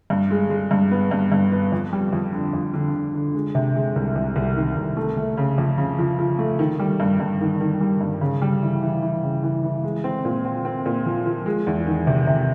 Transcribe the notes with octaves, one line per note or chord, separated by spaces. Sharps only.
G2
G#3
G#3
G2
B3
G2
G2
B3
F2
G3
F2
D3
F2
D3
D3
D3
G#3
C3
G#3
C2
C2
C2
D#3
C2
A3
A3
C#3
F2
C#3
F3
F3
A3
D#3
G3
G2
G2
D#3
D#3
G3
G2
C#3
G3
E3
E3
E3
C#3
E3
E3
G#3
C4
A#2
C4
C4
A#2
F3
F3
G#3
E2
D#3
C3
C3